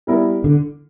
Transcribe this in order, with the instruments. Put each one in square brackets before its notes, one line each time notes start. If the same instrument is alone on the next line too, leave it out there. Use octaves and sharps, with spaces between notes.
[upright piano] G3 B3 E4 A#4
[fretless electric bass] D3